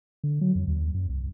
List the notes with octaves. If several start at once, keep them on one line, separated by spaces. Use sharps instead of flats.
D3
F#3
F2
D#2
F#2
C2